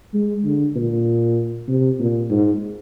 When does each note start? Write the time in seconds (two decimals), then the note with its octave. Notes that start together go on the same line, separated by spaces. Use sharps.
0.14 G#3
0.45 D3
0.76 A#2
1.68 C3
2.00 A#2
2.30 G#2